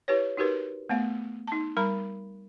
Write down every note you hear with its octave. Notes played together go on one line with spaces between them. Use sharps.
E4 G4 B4 C#5
D#4 F#4 G4 A#4 B4
A3 B3 F5
D#4 A5
G3 A#4 A#5 B5